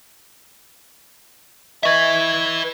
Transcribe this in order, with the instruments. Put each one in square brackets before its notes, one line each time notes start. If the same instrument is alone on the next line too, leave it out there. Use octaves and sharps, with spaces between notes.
[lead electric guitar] B4 E5 [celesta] D#5 C#6 G#6